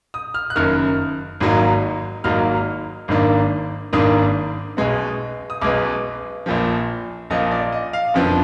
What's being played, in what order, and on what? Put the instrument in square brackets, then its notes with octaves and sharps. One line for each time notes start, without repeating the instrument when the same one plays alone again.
[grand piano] D#6
F6
F#6
F#1 F#2 D#3 F6
G#1 G#2 F#3 A#3 D#4
G#1 G#2 F#3 A#3 D#4 F6
G#1 G#2 D#3 A#3 D4
G#1 G#2 D#3 A#3 D4 D#6
B1 B2 G#3 B3
D#6
B1 B2 G#3 B3 D6
A#1 A#2 F3
A#1 A#2 F3 D#5
D5
D#5
F5
F#1 F2 F3 B3 D4